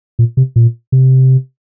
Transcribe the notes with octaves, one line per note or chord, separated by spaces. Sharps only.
A#2
C3
A#2
C3